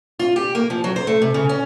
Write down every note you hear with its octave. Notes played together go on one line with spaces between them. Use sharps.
F4
G4
A#3
F3
F#3
C5
A3
C3
C#3
C#4